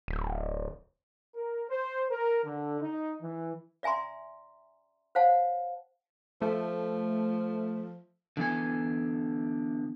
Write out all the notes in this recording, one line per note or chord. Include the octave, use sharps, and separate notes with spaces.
D1
A#4
C5
A#4
D3
D#4
E3
D5 E5 G#5 A#5 C6
C5 C#5 F5 F#5 A5
F3 A3
D3 E3 B3 G#5